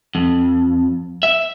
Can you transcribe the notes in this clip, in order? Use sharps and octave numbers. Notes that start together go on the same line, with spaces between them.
F2
E5